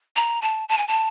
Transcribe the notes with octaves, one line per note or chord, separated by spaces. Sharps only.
A#5
A5
A5
G#5
A5